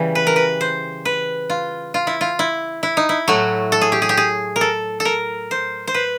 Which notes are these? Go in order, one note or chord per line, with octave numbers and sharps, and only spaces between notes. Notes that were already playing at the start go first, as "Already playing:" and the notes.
Already playing: C#3 E3 G3
B4
A#4
B4
C5
B4
F4
F4
E4
F4
E4
E4
D#4
E4
A2 F#3 A3 F#4
A4
G#4
G4
G#4
G4
G#4
A#4
A4
A4
A#4
C5
C5
B4